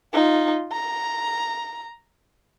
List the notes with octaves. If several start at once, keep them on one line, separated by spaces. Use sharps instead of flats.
D#4 F4
A#5